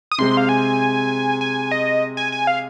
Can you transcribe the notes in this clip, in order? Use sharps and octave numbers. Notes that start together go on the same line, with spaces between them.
D#6
C3 G#3 C4 C6
F5
G#5
G#5
D#5
G#5
G#5
F5